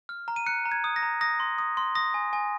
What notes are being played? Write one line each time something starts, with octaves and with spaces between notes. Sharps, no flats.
F6
A#5
D#7
F#6 C#7
A#5
G#6
D#6
A#6
A#5
D#6 A#6
C6
D#6
C6
D#6 A#6
G#5
G#5